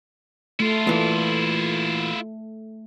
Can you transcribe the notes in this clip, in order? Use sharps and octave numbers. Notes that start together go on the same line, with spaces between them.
A3 E4 F4
A#2 E3